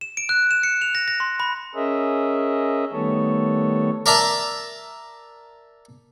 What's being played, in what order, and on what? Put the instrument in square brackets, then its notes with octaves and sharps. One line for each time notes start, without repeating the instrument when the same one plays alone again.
[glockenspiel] E7
D7
F#6
E7
C#7
F7
A#6
A#6
C6
B5
[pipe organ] C#4 G#4 A#4 D#5 E5
D#3 G3 A3 B3 A4 C#5
[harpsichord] A#4 D5 E5 A5 A#5